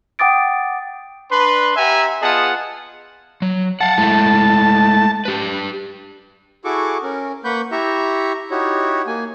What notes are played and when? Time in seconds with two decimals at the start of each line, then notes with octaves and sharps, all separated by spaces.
0.19 F#5 G5 D6 D#6 A6 D7
1.30 D4 B4 C6
1.76 G4 E5 F#5 G#5 A#5
2.22 B3 F4 G#4 D#5 F#5 A5
3.42 F#3
3.81 F5 F#5 A5
3.98 G#3 A3 E4
5.25 G4 B4
6.65 E4 F#4 G#4 A4 C#6 D6
7.03 C#4 A#4
7.44 A#3 B4 F#5 B5 C#6 G6
7.72 E4 G4 E5 A#5 C#6
8.51 D#4 E4 F#4 G4 C#5
9.07 A#3 G#5